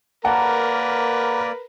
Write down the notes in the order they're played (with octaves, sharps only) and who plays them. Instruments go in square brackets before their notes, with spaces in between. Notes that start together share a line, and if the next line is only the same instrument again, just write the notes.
[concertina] A#3 D5 [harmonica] A#4 B4 [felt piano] F#5 A5 A#5